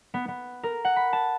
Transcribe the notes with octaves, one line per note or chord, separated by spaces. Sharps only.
B3
B3
A#4
F#5
B5
A5